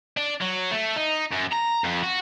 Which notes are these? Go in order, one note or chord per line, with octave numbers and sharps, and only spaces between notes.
D4
F#3
A3
D#4
F#2
A#5
F2
F#4